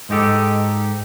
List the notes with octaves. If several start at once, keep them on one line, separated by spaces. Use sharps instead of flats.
G#2 G#3 D#4 G4 A4